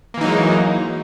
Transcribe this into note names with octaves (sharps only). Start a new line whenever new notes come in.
E3 F#3 G#3 A#3 D#4